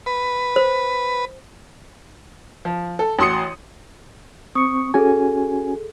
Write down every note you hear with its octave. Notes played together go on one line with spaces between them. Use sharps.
B4
C5
F3
A4
A1 F#4 C6 D#6 C#7
C4 C#6 D#6 C#7
C#4 F#4 G#4 A4 G#5